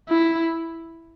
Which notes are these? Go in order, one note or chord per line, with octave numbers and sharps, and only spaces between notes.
E4